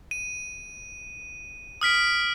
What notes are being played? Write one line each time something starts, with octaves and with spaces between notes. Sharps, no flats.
D#7
D#6 F6 B6 D7